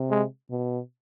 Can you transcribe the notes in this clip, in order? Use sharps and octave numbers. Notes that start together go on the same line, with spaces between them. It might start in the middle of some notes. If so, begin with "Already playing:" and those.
Already playing: C3
G#3
B2